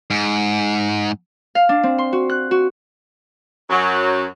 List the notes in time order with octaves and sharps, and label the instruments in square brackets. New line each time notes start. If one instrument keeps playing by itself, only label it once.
[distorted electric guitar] G#2
[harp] F5
D4
C4
C6
F#4
F#6
F#4
[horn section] F#2 F#3